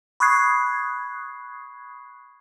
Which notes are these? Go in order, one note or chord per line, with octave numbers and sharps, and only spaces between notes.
B5 C#6 D#6 F#6 G#6 C7